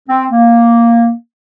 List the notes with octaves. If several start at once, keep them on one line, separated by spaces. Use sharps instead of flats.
C4
A#3